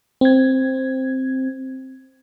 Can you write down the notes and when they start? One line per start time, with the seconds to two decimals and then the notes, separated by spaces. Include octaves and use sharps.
0.21 C4 G#6